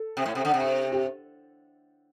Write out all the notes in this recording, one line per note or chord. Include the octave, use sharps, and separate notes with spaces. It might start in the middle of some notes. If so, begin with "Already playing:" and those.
Already playing: A4
C3
A2
C3
D3
C3
G4